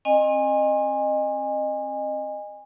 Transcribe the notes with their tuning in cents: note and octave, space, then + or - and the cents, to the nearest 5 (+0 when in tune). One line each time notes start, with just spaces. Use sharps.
C4 +35 D#5 -25 G#5 -25